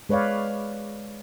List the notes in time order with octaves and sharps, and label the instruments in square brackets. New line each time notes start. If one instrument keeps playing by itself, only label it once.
[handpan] G#3 B4 C#5 D5 F5